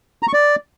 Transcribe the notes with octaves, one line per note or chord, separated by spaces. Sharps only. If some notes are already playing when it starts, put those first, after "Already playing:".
A#5
C#6
D5